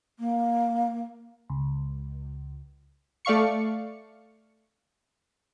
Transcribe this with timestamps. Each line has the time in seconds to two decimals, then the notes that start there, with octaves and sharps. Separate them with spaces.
0.19 A#3
1.50 C#2
3.25 A3 D5 F5 C#6 C#7